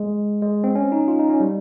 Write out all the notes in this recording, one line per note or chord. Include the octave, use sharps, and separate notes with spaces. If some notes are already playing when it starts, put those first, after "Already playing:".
Already playing: G#3
G#3
C4
C#4
D#4
F4
D#4
C#4
G3